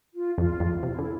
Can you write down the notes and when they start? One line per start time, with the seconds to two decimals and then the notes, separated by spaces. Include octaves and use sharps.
0.15 F4
0.38 F2 F4
0.60 F2
0.83 C3 E4
0.99 D3